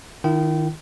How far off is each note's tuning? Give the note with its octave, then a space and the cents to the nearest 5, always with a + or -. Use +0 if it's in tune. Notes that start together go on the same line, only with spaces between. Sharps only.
D#3 +0 E4 +45 G5 -30